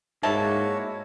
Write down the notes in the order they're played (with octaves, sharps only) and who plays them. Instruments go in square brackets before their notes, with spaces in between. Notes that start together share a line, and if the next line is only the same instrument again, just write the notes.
[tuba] G#2 [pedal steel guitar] G#3 E4 F#4 [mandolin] A#3 E5 A5 [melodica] C#5